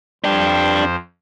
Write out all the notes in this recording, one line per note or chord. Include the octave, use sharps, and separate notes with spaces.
F2 D4 G4 C5